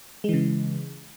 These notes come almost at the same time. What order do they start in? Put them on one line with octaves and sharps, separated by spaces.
G#3 E3 C#3